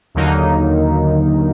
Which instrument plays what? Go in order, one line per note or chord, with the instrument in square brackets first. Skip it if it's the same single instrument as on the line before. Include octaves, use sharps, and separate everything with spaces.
[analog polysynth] D#2 D3 F#3 A#3 D#4